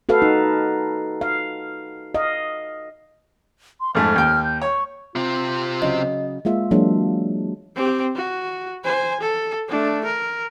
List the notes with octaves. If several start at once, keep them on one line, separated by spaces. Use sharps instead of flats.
F#4 A4 B4 F5
D#4
F5
D#5 F5
C6
F2 G#2 A3 F6
D#2 G5
G6
C#5 C#6
C3 C4 F4
C#3 F#3 D#5
G#3 A#3 F4 E5
E3 F#3 G#3 A#3 D4
C4 G4
F#4
C5 G#5
A4
A3 D4
A#4